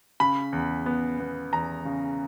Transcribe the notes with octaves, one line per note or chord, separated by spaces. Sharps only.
C#3 B5
E2
B3
B3
E2 A#5
C#3